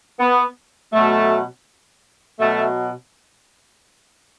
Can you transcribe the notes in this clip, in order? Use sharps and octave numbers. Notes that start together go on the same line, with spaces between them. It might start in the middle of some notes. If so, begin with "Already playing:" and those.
B3
B2 F#3 A3
B2 F#3 A3